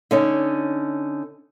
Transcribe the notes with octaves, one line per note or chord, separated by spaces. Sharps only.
D3 C#4 D#4